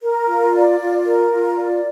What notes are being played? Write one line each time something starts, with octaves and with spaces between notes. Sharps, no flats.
A#4
F4
D5
F4
A#4
F4
D5